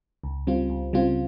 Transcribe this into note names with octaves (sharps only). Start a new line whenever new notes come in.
C#2
C#3 G3 C4 F4
C#2
C#3 G3 C4 F4